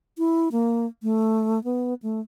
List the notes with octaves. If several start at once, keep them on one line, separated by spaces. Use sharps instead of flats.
E4
A#3
A3
B3
A3